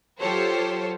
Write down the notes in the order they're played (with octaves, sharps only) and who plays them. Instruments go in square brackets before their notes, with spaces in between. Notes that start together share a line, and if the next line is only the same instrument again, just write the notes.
[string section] F#3 F4 G4 A4 C5 C#5